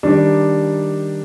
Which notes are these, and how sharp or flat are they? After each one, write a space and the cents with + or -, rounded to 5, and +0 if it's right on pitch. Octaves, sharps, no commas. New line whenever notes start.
D#3 -5 G3 +0 D4 +0